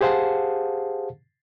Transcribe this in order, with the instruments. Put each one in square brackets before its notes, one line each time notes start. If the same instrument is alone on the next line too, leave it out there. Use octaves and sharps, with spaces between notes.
[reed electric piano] G4 G#4 C5 F5 F#5 A5